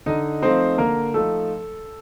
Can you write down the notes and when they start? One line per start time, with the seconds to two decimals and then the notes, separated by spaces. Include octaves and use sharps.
0.06 D3 D#4 D#5
0.42 F3 A3 C4 D#4 C5
0.78 D3 A#3 A#4
1.14 F3 A3 D#4 A4